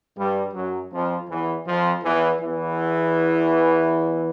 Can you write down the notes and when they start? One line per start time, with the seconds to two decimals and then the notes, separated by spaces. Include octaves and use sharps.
0.17 G2 G3
0.54 F#2 F#3
0.92 F2 F3
1.29 E2 E3
1.67 F2 F3
2.04 E2 E3
2.41 E2 E3